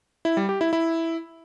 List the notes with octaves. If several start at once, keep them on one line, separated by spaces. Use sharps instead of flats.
E4
G3
G4
E4
E4